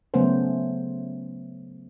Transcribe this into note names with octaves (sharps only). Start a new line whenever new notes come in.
C#3 F#3 A3 B3 C#4 C5